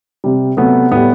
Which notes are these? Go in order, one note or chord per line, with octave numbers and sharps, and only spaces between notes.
C3 G3
C3 F#3 A3 B3
A2 G3 B3